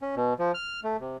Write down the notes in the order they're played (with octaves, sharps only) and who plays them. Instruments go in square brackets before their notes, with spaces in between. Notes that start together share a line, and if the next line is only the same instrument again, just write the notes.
[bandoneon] C#4
B2
F3
F6
A3
C3